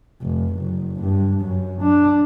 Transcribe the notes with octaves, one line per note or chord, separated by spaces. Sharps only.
F1
F#1
G2
F#2
D4